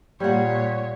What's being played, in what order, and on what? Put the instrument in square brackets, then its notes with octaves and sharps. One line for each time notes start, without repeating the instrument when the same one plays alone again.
[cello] A#2 C#5 [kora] G3 F#5